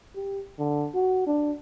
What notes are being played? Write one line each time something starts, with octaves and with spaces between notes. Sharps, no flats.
G4
D3
F#4
D4